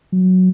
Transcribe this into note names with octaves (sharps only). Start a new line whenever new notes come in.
F#3